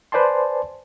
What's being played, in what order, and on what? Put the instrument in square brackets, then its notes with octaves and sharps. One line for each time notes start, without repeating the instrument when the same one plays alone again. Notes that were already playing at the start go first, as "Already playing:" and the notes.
[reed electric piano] B4 C5 D5 G#5 A5 C6